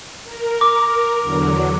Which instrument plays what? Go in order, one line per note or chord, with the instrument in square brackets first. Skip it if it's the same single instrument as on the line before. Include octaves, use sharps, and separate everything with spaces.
[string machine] A#4
[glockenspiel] D6
[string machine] E2 D3 F#3